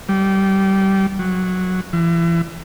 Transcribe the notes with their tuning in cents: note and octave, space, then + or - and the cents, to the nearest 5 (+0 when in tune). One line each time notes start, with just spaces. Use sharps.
G3 -20
F#3 -10
E3 +35